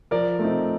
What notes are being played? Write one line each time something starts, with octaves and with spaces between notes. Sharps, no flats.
F3 A#4 D5
A3 C4 D#4